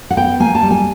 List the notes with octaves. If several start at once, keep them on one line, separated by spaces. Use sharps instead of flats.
F#5
B3 G5
A#3 G#5
A5
G3
G#5